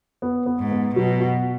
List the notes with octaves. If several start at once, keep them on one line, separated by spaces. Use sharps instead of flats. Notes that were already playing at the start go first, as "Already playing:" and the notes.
B3
B3
G#2
B3
B2 F#3
F#4